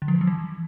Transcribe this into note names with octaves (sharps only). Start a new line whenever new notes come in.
D3
F3
E3
F#3
E3